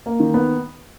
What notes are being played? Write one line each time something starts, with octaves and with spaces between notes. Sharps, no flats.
A#3
D#3
B3